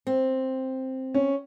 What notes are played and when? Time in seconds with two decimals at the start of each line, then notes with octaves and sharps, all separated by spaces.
0.07 C4
1.14 C#4